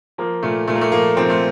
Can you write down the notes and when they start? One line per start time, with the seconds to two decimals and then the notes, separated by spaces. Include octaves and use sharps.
0.18 F3 A#3
0.43 A#2 A3
0.67 A#2 A3
0.75 A#3
0.81 A3
0.92 F3 A#3
1.17 F3 C4
1.29 A3